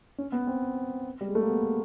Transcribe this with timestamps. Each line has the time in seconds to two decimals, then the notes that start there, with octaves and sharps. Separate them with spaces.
0.18 C#4
0.32 B3
0.47 C4
1.21 G3
1.28 G#3
1.35 A3
1.42 A#3
1.49 B3